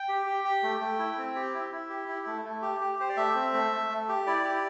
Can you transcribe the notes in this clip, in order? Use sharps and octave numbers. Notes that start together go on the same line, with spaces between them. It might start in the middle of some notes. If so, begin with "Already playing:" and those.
Already playing: G5
G4
G4
G4
A3
A3
E4
C4
G4
E4
E4
G4
E4
A3
A3
G4
G4
G4 C5
D5
A3 E5
C4
A3
A3
A3
G4
E4 D5
G4